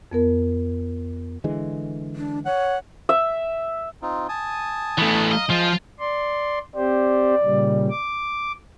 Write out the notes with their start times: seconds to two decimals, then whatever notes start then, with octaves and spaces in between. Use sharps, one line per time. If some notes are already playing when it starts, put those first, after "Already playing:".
0.12 F2 B3 A#4
1.44 D3 E3 G#3
2.16 D4
2.45 C#5 F#5
3.09 E5
4.02 C4 D#4 F4
4.29 G#5 A5 D#6
4.98 D2 E3 A3 B3
5.31 D#5 F5 A#5
5.50 F3 G#3 F4 D#5
6.00 D5 C6
6.76 C4 G4 C5 D5
7.43 A#2 C#3 G3
7.90 D6